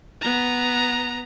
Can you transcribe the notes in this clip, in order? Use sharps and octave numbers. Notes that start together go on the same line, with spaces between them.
B3 A#5